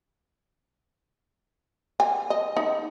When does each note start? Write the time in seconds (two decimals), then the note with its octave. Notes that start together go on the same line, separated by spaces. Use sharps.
2.00 G#5
2.30 D#5
2.57 D#4